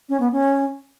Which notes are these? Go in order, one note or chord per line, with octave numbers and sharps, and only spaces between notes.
C#4
B3
C#4